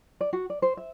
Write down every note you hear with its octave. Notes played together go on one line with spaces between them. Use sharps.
D5
F#4
D5
C5
E5